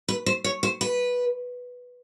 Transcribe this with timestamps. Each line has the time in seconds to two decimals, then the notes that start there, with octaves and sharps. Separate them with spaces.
0.08 B4
0.26 C5
0.44 C#5
0.63 C5
0.81 B4